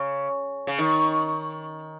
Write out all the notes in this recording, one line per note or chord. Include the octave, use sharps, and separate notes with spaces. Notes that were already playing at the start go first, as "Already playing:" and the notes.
Already playing: C#3
C#3
D#3